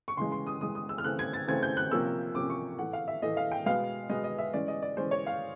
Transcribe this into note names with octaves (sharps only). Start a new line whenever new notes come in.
C#6
C#3 E3 G#3 C6
C6
D#6
C#3 E3 G#3 D#6
D#6
E6
F6
C#3 E3 A3 C4 F#6
G#6
A6
C#3 E3 A3 C4 G#6
G6
F#6
C3 F3 A#3 C#4 E6
C3 F3 A#3 C#4 D6
C#6
A2 E3 A3 F#5
F5
E5
A2 E3 A3 D#5
F5
G5
B2 G#3 B3 F5
B2 G#3 B3 D#5
D#5
E5
E3 G#3 C#4 D5
D#5
D5
E3 G#3 C#4 C5
C#5
F5